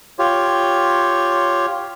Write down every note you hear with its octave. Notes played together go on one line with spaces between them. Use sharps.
F4 G4 C#5